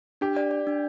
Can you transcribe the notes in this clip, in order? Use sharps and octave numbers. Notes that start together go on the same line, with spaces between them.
D4 G4
D5
D5
D4